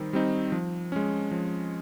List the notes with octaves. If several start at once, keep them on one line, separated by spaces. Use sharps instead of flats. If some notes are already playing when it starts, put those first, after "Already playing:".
Already playing: D#3 G3 C4 D#4
G3 C4 D#4
F3
G#3 C#4
F3